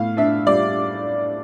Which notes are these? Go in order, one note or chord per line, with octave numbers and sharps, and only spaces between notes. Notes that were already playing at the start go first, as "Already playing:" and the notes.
Already playing: A2 B3 F5
D4 E5
G3 D5